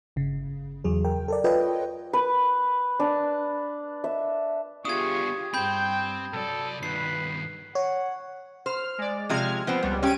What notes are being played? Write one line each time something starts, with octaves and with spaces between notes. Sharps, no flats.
G1 C#3
E2 F#3 G#4
A#4 G5
A4 A#4 D5
F4 A4 B4 C#5 D#5 G5
B4
D4
E5
B3 D4 F4 G4 G#4 C#6 D#6 G#6
G2 C4 C5 G5 B5 G6
C2 F#3 A4 D5
G2 B2 D#3 B4 C7
C#5 F#5
C5 F6
G#3 D5
C3 F3 G#3 F6 G#6
F3 B3 C4 C5
C#2 G3 B3
C#4 G4 G#6 D7 D#7